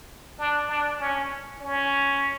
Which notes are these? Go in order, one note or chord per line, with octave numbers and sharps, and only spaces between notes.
D4
D4
C#4
C#4